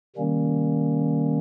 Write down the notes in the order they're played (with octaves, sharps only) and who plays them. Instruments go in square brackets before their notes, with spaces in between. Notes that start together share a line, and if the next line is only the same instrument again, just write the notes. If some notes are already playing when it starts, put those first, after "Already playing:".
[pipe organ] C3 D#3 G3 A#3 C#4